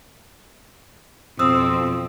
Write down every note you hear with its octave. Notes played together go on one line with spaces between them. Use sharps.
F2 B2 C4 D#6 E6